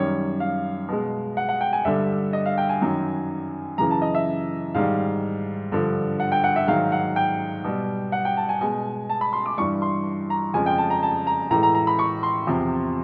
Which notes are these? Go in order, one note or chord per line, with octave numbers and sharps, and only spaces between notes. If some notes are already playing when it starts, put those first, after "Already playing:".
Already playing: F#2 D#3 G3 C#5
F5
B2 G#3
F#5
F#5
G5
G#5
G2 D3 G3 E5
D#5
F5
G5
G#5
F#2 D#3 F#3
F#2 C#3 E3 A#5
A5
D#5
E5
G#2 D#3 G3 F5
G2 D3 F3
F#5
G5
F#5
E5
G#2 D#3 F#3 F5
F#5
G5
B2 G3
F#5
G5
A5
G#5
B2 G#3 G#5
A5
B5
C6
D6
G2 E3 G3 C#6
C6
A#5
F2 C#3 F3 G#3 G#5
G5
A5
A#5
A5
A#5
A2 E3 G#3 A#5
A#5
A#5
B5
C#6
C6
E2 C3 F3